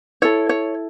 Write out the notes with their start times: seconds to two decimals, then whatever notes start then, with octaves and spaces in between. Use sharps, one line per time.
0.22 E4 A4 C#5
0.49 C#5